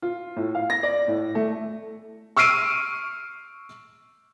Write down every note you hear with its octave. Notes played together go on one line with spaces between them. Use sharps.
F4
A2
F5
A#6
D5
A2
A3
C#6 E6 F6 C7 D7 D#7